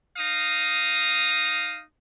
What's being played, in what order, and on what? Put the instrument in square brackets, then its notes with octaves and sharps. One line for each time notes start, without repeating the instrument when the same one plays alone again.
[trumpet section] D#4 F5 D#6